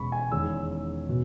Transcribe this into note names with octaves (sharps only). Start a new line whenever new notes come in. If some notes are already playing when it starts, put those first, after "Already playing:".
Already playing: E1 E2 C#3 G#3 B3 B5 C#6
G#5
E2 D#3 G#3 C#4 E6
B2